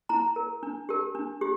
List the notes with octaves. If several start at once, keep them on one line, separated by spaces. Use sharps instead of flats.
E4 A#5
A#4
D4
G4 A#4
D4
G4